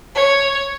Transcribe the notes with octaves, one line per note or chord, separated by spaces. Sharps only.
C#5